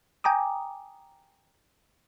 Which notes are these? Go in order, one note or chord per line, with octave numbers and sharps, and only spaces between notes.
G5 G#5 A#5 D6 D#6